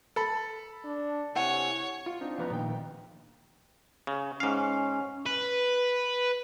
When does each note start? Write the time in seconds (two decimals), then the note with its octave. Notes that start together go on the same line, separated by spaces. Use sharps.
0.16 A4 B5
0.85 D4
1.35 C3 E4 C#5 F#5 G#5
2.06 F4
2.21 C4 D4 D#4 F4
2.38 F2 B3 A#5
2.50 A#1 A#2 D#3 G5
4.07 C#3
4.40 G#2 C#4 F5
5.26 B4